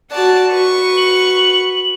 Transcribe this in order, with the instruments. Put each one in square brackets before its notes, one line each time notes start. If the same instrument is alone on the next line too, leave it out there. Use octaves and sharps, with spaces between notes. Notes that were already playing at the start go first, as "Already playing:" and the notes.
[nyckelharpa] F#4 F#5 [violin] D5 A5
[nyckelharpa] F#4 B4 [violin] C#6
[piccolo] F#7